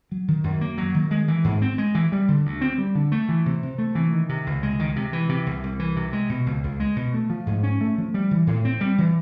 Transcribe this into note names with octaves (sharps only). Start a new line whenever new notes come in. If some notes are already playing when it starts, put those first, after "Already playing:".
F#3
D#3
F#2
A#3
F#3
D#3
G#3
E3
G#2
C4
G#3
E3
G3
D3
D2
C4
G3
D3
A3
E3
C3
C3
A3
E3
D#3
C3
C#2
G#3
D#3
C3
E3
C3
C2
C2
E3
C3
G#3
B2
C#2
C#2
G#3
B2
A3
F3
G#2
C#4
A3
F3
G3
E3
A2
C4
G3
E3